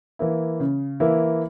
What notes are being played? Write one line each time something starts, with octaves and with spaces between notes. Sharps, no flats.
E3 A#3 E4
C#3
E3 A#3 E4